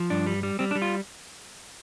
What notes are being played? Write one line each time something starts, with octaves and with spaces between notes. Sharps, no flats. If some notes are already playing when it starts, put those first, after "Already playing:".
Already playing: F3
G2 D4
G3
G3
G3 C4
D4
G3
F4